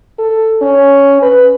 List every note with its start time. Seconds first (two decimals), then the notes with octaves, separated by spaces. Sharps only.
0.19 A4
0.62 C#4
1.22 B4